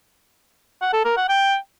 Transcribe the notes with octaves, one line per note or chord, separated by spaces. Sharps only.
F#5
A4
A#4
F#5
G5